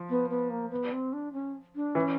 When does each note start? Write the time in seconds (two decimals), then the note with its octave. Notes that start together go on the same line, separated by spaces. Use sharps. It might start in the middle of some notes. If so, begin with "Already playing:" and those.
Already playing: F3
0.10 B3
0.30 B3
0.50 A#3
0.71 B3
0.93 C4
1.13 D4
1.33 C#4
1.75 D4
1.95 E3 C#4